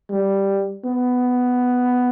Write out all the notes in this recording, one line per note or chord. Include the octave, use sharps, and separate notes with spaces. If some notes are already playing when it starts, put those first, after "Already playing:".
G3
B3